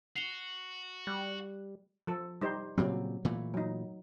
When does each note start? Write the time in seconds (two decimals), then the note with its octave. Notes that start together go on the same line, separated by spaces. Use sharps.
0.16 F#4 C7 F7 G7
1.07 G3 F#6
2.07 F3 A4
2.41 G3 D#4 C5
2.78 A#2 C#3 F#3 G3 C4
3.25 A#2 E3 A3
3.54 F#3 D#4